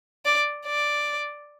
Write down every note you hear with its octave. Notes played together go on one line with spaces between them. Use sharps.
D5
D5